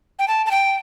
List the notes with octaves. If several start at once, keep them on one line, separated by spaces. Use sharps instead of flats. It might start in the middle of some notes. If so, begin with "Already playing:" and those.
G5
A5
A5
G5